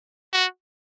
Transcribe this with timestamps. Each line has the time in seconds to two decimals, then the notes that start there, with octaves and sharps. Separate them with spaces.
0.33 F#4